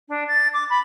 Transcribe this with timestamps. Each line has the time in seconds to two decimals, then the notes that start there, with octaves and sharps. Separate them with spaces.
0.09 D4
0.28 A6
0.53 D6
0.70 B5